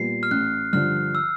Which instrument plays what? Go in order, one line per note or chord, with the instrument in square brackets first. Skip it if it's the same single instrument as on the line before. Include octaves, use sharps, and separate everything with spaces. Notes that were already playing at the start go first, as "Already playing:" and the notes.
Already playing: [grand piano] A#2 G3 B3 [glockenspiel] C7
[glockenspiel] F6
[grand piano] A1 [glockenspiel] F#6
[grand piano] G2 D3 F3 [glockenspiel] F6
[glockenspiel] E6